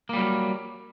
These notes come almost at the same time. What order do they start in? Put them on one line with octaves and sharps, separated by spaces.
A#3 G3 F#3